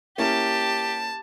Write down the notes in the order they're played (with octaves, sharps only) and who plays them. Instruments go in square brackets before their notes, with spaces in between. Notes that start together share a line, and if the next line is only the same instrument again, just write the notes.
[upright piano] A#3 C#4 E4 [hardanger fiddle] G4 [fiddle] A5